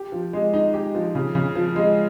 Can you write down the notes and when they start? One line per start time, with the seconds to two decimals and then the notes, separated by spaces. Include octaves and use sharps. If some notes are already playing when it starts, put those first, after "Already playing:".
Already playing: G4
0.12 F3
0.33 G#3
0.54 D#4
0.74 G4
0.95 F3
1.15 C#3
1.35 C#3
1.55 F3
1.76 G#3